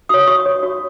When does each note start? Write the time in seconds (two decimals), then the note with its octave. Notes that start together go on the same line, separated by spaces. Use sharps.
0.09 F#4 C#5 D#6
0.23 D#6
0.27 F#4 C#6
0.46 C#5
0.63 F#4